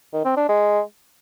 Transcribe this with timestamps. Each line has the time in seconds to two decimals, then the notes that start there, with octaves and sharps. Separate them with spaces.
0.13 D#3
0.25 C4
0.37 D4
0.48 G#3